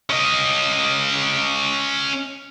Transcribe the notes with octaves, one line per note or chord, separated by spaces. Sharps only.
C#4 D#5